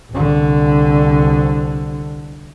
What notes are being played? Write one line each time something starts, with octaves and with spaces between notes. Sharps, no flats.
C2 D3